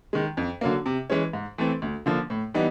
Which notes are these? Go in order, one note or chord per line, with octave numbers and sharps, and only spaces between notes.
D#3 G#3
F2
D3 F#3 A#3
C3
E3 G#3 C#4
G#2
E3 A3 C4
D2
D3 F3 A#3
A2
E3 G3 B3 D#4